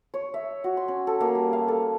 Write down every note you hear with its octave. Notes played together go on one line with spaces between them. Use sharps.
C#5
E5
F#4
C6
C#4
A4
A#3
G3
F5
A4